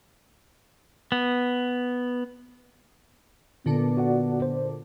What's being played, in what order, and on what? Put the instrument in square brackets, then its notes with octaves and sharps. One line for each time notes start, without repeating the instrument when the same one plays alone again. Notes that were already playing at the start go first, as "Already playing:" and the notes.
[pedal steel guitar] B3
[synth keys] A#2 D3 D4 [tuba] B3
[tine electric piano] F#4 D5 F#5
C5